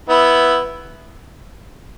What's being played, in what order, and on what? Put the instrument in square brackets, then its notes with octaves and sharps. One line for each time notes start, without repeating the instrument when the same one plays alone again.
[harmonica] B3 E4